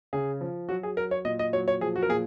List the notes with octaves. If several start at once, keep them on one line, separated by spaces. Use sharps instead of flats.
C#3 G#4
F3
F#3 F#4
G#4
F#3 A#4
C#5
A#2 D#5
D#5
F#3 C#5
C#5
F3 G#4
F#4
A#4
A#2 G#4